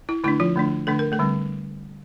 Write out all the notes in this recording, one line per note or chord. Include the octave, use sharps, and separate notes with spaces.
E4
D3 A3 D4 E4
F3 F4
D3 A3 D4
D3 A3 D4 A4
A#4
A3 A4
D3 G3 C4